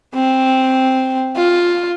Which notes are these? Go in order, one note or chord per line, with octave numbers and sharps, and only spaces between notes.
C4
F4